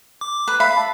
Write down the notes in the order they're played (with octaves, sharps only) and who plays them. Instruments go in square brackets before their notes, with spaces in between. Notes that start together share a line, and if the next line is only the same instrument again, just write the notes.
[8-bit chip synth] D6
[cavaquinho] B4
[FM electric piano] E5 [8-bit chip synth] F5 [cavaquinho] B5
[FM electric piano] A5